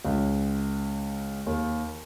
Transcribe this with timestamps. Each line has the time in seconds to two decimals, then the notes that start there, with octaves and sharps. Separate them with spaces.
0.05 C#2
1.47 D#2